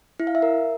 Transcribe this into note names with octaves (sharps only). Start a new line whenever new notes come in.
E4
F5
E5
A#4